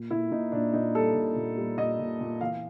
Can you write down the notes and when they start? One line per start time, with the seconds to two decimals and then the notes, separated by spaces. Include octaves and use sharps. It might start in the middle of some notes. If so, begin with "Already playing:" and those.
Already playing: A#2
0.11 A#2 E4
0.31 A#2 D#4
0.52 A#2 D4
0.73 A#2 D#4
0.95 G3 A4
1.15 A#2
1.36 A#2
1.57 G3
1.78 A#2 D#5
1.99 A#2
2.20 A#2
2.41 E3 F5